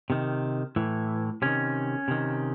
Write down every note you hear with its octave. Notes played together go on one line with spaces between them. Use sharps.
C3 D#3
A2 E3
C3 D#3 C#4
C3 D#3